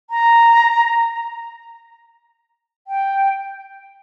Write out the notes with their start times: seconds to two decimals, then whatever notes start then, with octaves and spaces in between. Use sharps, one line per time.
0.10 A#5
2.87 G5